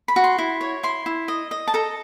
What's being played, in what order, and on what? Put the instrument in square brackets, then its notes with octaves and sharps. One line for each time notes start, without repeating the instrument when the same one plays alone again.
[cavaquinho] B5
F#4
C6
E4
C#5
E4 C6
E4
D#5
D#5
A5
A4 A#5